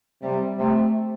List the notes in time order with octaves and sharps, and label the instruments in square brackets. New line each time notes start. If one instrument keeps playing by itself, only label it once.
[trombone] C3 [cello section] G3
[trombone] C3 [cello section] A3